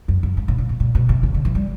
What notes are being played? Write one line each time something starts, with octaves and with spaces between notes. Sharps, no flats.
F#2
F#2
G#2
A2
A#2
A#2
A#2
B2
C3
C#3
D3
E3
G3